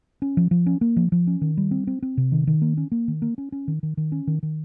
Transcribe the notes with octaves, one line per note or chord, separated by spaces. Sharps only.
C#4
F3
F3
C#4
A#3
F3
F3
C#4
D#3
G3
C4
C4
C4
C3
D#3
D#3
A#3
C#4
A#3
D#3
A#3
C#4
C#4
D#3
D#3
D#3
C#4
D#3
D#3